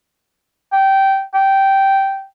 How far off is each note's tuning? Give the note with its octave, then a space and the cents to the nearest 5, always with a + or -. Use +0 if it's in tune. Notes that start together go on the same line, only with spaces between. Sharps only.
G5 -15
G5 -10